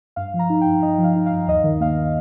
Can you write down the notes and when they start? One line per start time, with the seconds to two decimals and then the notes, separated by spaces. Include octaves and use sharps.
0.16 G2 F5
0.34 F3
0.39 A#5
0.50 D#4
0.61 G2 G5
0.82 G2 D#5
0.98 F3
1.04 F5
1.16 D#4
1.26 F5
1.31 G2
1.48 D#2 D#5
1.64 D#3
1.80 A#3 F5